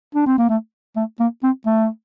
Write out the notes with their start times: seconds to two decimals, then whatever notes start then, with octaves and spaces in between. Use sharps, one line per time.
0.15 D4
0.26 C4
0.38 A#3
0.49 A3
0.97 A3
1.20 A#3
1.43 C4
1.66 A3